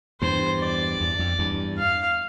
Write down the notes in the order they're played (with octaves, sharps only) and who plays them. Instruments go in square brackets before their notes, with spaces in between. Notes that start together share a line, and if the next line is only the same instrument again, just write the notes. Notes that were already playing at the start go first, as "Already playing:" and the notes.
[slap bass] E2 G2 [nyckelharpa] C5
[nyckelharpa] D5
[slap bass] E2
F2
E2 G2
[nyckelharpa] F5